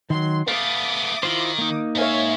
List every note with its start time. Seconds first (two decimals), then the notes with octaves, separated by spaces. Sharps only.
0.10 D#3 F#3 C6
0.48 A3 B3 F5 D6 D#6
1.23 D#3 E4 F4 C5
1.58 A#3 D#4
1.95 G#2 C#5 E5 F5 G#5